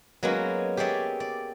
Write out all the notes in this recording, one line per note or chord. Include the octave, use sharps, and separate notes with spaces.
F#3 G#3 A#3 B3 C#4 F#4
G4 G#4 C#5 D5 E5
D5